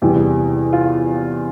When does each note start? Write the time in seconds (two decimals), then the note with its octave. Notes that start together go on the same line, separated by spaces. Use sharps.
0.02 E2 C3 E3 G3 G4
0.73 F4